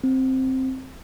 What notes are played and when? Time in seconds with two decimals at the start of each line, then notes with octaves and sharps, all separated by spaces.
0.04 C4